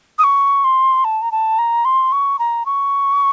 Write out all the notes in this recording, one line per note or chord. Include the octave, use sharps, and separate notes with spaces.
D#6
C#6
C6
A5
A#5
A5
A#5
C6
C#6
A#5
C#6